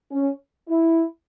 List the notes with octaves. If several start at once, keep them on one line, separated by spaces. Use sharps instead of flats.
C#4
E4